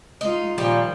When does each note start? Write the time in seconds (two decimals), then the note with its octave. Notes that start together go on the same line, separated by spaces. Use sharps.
0.21 G#3 D#4 F4
0.58 A#2 D#3 F3 G3 G4